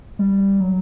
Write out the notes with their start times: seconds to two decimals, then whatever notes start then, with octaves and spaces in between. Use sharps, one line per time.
0.19 G3
0.60 F#3